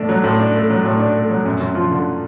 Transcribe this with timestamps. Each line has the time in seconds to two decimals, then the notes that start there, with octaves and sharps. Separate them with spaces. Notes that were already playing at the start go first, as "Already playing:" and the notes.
Already playing: A2 A3 D4
0.09 F#3
0.24 A2
0.40 D4
0.54 A3
0.70 F#3
0.85 A2
0.99 D4
1.15 A3
1.30 F#3
1.45 F#2
1.60 F#2
1.75 F3
1.91 D3